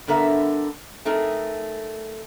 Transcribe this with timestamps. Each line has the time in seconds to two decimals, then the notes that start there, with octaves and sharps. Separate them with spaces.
0.07 G2 D3 B3 A#4 E5
1.05 A3 C4 D#4 G#4 A#4